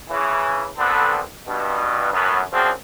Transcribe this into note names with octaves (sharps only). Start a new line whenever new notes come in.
C#3 E3
C2 D3 B3 C4 A4 B4
G2 B2
F#2 A2 B3
F#2 F3 C4 D4 F#4 G#4